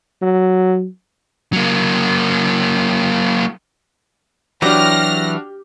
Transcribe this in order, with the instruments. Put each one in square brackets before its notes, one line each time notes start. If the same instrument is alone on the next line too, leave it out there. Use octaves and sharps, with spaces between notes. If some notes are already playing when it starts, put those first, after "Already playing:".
[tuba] F#3
[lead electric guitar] F#3 A#3
[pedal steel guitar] E3 F#3 [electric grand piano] D4 F#4 [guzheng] G4 [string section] F6 A#6